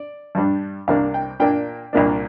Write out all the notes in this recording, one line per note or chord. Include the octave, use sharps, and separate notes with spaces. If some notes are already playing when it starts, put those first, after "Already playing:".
Already playing: D5
G2 G3 D4
C2 C3 A#3 D4 F5
G5
A#2 A#3 D4 G5
C2 A#2 A#3 D4